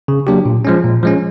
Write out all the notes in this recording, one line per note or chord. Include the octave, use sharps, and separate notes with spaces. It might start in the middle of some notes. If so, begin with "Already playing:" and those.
C#3
F#3 A#3 D4 G4
A#2
F3 G#3 C#4
A#2
F3 G#3 C#4